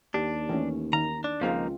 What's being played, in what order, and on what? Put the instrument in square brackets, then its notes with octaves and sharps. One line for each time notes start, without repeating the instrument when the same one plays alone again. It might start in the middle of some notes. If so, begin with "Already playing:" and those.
[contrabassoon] D#2 [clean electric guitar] D4 [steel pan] G4
[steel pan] E3 A3 C#4
[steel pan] D#3 [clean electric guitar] A#5
[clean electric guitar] D4
[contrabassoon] C#2 [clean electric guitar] F3 A#3 D#4 [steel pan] G#3 C4 F4